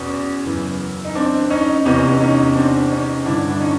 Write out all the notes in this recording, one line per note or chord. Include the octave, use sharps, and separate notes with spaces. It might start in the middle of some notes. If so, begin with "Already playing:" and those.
Already playing: E2 B2 B3 C#4
F#2 C#3 E3
D#4
C4 D4
C#4 D#4
E2 C3 E3 C#4 D#4
C#4 D#4
C4 D4
C#4 D#4
G2 D3 D4 E4
D4
C#4 D#4